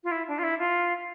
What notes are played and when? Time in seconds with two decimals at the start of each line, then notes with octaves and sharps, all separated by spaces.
0.03 F4
0.11 E4
0.27 D4
0.38 F4
0.43 E4
0.58 F4